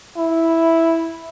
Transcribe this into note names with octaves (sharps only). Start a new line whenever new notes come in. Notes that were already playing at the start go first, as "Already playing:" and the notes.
E4